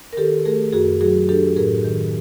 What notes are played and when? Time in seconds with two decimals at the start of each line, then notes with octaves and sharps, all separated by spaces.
0.13 A#4
0.17 D#3 G4 A4
0.45 A3 G#4 A#4
0.73 F#2 F#4 G#4
1.01 F#3 F#4 G#4
1.29 D4 G4 A4
1.56 A2 G#4 A#4
1.84 D#3